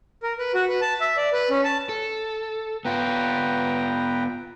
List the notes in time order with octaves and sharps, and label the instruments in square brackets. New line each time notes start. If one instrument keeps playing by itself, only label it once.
[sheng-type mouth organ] A#4
B4
F#4
B4
A5
E5
D5
B4
C#4
A5
[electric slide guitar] A4
[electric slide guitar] B3 F4 [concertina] B4 G5 A#5